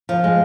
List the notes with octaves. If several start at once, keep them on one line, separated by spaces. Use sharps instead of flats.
F3
G#3